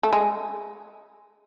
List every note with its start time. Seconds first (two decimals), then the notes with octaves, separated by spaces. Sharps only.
0.03 A3
0.13 G#3